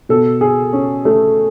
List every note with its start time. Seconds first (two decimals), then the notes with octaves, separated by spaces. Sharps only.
0.09 B2 A4
0.41 G#4
0.73 C#4
1.05 A3